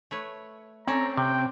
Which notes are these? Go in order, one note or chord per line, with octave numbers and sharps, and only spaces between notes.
A3 B4 C#5
C4 C#4 A4 D5 A#5
C3 G5